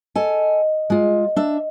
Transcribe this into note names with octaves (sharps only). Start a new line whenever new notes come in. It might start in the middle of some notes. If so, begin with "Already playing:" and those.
A4 D#5 G#5
G#3 F4
D4 E5